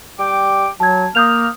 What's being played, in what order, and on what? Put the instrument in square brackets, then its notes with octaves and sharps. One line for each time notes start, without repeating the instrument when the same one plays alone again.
[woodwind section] G3 G5 D6
[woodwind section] F#3 [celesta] A5 G#6
[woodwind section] A#3 F6 [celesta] D#6 G6 F7